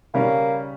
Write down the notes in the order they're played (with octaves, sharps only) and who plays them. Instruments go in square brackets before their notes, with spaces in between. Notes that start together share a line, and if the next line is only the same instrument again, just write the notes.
[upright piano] C#3 G3 C#4 [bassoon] A#3